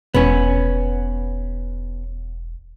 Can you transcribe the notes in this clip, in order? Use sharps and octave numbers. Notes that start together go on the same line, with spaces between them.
E1 B3 C#4